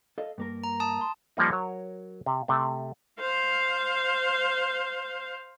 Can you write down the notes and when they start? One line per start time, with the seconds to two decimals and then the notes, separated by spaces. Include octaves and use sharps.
0.18 A4 D#5 F5
0.38 G2 A#3 A#4
0.64 A#5
0.80 A5 D#6
1.01 C6
1.37 F3 G3 A#3 D#4
1.51 F#3 A#4 C#5
2.26 C3
2.48 C3 A3
3.19 C5 F5